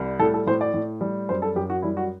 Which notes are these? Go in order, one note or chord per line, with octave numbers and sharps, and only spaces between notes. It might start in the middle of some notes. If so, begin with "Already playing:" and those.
Already playing: C2 G3
A2 A4
A4
A2 C5
D5
A2
G3
F#2 C5
A4
F#2 G4
F#4
G3 E4
F#4